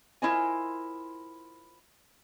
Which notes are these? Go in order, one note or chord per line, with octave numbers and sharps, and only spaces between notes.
E4 F4 A#4 C5 D#5 G#5